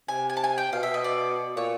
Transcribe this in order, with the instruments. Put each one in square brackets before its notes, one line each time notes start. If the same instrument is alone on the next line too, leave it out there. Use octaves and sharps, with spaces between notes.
[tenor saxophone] C3 [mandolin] G#5
[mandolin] G#5
A5
G#5
G5
[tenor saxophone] B2 [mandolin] F5
[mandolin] E5
D#5
D5
[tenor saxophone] A#2 [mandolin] C#5